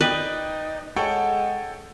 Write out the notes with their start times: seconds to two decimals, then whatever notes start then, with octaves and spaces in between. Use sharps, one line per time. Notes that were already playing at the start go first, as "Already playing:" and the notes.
0.01 D#4 B4 D5 D#5 G5
0.96 G#3 A4 C#5 F#5 G5